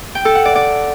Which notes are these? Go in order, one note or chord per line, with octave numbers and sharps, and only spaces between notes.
G5
A4
F#5
D5
D5